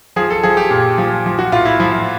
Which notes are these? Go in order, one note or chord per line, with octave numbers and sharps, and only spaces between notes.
F3 G#4
A4
F3 G#4
G4
A#2
F3
F3
F#4
A2 F4
E4
F3 E4